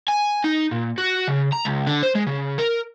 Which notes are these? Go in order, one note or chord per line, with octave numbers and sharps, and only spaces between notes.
G#5
D#4
A#2
F#4
C#3
A#5
C#2
D3
C5
G#3
C#3
A#4